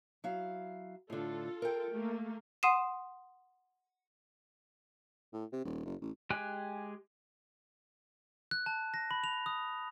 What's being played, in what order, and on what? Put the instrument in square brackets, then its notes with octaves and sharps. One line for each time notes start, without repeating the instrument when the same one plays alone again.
[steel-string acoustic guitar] F#3 E4 F5
[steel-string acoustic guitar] A2 D3 [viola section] F4 A4
[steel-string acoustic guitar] A#4 G5
[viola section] A3 A#3
[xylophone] F#5 C6 D#6 C7 D#7 E7
[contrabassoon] A2
C3
D#1
F#1
A1
[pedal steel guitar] G#3 G4 G5 G#5 F#6
[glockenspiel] F#6
A5
A#6
B5
F7
D#6